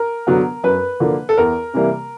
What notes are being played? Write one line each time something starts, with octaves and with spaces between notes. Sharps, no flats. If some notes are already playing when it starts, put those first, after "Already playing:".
Already playing: A#4
D3 F#3 B3
F#2 B4
D3 F3 A#3
A4
E2 A#4
C3 E3 G3 A#3